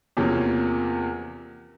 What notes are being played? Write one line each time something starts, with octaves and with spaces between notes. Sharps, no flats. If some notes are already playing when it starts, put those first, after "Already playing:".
E2 C3 F3 A#3 C#4